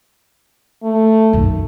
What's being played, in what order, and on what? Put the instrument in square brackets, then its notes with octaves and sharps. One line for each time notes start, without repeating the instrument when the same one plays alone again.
[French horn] A3
[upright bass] B1 F#2